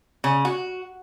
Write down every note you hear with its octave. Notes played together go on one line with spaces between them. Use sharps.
C#3
F#4